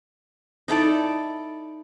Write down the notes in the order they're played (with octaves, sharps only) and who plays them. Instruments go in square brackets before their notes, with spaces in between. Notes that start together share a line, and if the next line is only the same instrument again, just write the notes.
[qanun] D#4 E4 A4 D5